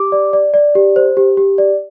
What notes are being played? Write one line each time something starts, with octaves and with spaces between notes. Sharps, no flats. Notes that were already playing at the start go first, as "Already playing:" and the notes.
Already playing: G4 D6
D5
D5
D5
G4
C5
G4
G4
D5